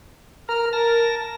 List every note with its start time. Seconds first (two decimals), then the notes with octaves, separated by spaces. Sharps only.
0.49 A#4 A#5 F6
0.73 A#4 A5 A#6